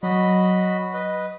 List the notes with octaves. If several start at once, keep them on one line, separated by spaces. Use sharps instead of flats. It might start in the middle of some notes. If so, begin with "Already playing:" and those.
F#3 F#4 D#5 B5
B4 D#5